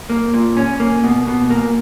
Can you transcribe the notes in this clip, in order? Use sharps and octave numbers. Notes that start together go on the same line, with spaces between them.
A#3
A#2
C#4
A#3
B2
B2
A#3